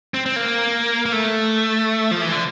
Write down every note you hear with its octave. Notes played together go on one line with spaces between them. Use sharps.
C4
C4
A#3
A#3
A3
F3
E3
D3